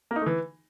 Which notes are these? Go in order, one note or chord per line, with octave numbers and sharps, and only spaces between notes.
A#3
D#4
A3
E3